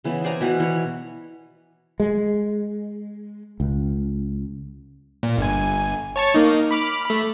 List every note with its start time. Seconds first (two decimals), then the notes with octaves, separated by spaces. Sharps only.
0.04 C#3 E3 B3
0.24 C5 D5 G#5 A#5
0.41 B2 E3 F#4
0.60 E3 B4 C#5
2.00 G#3
3.60 C#2
5.23 A#2
5.38 G1 G#5
6.16 C#5 A5 C#6
6.34 A#3 D#4
6.71 B5 D6 F6
7.05 A3 B5